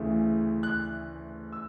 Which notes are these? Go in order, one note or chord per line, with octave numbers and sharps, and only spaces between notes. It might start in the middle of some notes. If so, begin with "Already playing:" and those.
Already playing: D2 C#3 E3 A3
F#6
E6